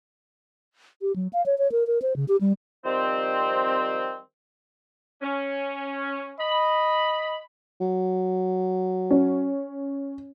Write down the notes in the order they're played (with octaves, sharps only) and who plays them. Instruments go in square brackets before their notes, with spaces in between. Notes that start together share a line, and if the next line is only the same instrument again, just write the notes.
[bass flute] G4
F#3
F5
C#5
C#5
A#4
A#4
C5
C#3
G4
G3
[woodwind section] D#3 F3 G3 C4
[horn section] C#4
[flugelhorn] D#5 [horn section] B5
[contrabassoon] F#3
[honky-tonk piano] C#4